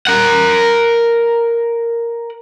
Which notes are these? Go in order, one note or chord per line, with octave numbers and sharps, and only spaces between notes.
A#4 F#5